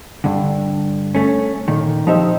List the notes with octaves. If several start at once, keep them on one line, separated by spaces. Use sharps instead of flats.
G2 D3
A3 C#4
A#2 D#3
F3 D#4 G4 C5 E5